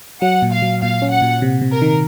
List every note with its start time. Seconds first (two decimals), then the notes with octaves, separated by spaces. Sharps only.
0.22 F#3 F#5
0.42 A#2
0.52 F5
0.62 F#3
0.82 A#2 F5
1.02 C#4
1.11 F#5
1.22 A#2
1.42 C3
1.62 C3
1.71 A#4
1.82 D#3